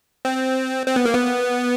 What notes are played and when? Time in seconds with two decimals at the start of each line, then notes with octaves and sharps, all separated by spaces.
0.25 C4
0.87 C4
0.96 B3
1.05 A#3
1.14 B3